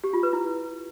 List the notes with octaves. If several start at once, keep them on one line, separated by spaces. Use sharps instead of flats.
G4
F4
B4
E4